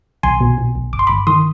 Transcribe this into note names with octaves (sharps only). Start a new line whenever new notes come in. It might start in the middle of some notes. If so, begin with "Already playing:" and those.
B1 G#5 C6
B2
B2
B1
G1 D6
C6
G1 B5 D6
D#3 C6 D#6